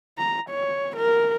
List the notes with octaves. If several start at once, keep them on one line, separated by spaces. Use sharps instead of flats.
A#5
C#5
A#4